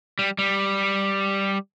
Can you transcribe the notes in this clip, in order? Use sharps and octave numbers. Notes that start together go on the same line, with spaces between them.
G3
G3